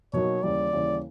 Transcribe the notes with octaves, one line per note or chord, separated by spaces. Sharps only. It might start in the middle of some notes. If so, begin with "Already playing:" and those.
B2 F#3 A#3 D#4 F#4 C#5
D#2 C#3 E3 G3 D5
D#2 C#3 E3 G3